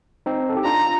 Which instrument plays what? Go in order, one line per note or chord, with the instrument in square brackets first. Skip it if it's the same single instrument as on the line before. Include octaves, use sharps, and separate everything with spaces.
[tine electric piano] C4 D#4
A4
G4
[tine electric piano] D4 F4 [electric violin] A#5